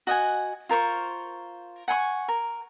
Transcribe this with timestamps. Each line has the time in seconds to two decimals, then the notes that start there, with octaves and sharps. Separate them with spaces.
0.07 F#4 D#5 F#5 G#5
0.69 F4 A#4 C5 C#6
1.88 F#5 G#5 C6 C#6
2.28 A#4